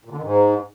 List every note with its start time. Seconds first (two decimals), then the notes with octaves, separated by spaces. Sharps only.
0.05 A#2
0.11 D3
0.17 D#3
0.23 G#2